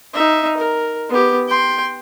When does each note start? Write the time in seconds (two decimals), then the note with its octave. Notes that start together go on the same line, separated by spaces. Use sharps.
0.14 D#4 E5
0.57 A#4
1.09 B3 G4
1.49 G5 C6